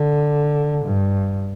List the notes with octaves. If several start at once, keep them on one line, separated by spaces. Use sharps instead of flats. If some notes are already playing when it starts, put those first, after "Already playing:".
Already playing: D3
G2